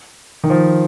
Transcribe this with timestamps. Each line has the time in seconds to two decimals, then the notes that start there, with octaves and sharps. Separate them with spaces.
0.44 D#3
0.50 F3